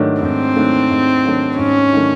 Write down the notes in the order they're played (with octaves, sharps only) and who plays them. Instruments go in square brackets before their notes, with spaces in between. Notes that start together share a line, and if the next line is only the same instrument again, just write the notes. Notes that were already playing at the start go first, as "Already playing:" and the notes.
Already playing: [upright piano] G#2 D#3 F#3 A3 D4
[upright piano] G#2 [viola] C4
[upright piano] D#3 F#3 A3 D4
G#2
D#3 F#3 A3 D4
[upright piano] G#2 [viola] C#4
[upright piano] D#3 F#3 A3 D4